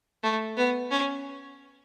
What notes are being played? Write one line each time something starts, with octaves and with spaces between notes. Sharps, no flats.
A3
B3
C#4